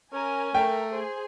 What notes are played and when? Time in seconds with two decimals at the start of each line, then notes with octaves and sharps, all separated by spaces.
0.13 C#4 A#4 G#5
0.55 A3 A#4 G5
0.92 G#4 C5